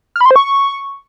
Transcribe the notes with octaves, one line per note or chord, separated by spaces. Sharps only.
F6
B5
C6
C5
C#6